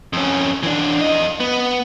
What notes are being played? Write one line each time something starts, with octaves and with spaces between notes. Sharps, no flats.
F2 C#4
E3 D4
F2 D#5
B3